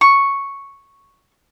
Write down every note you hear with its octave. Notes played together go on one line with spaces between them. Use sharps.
C#6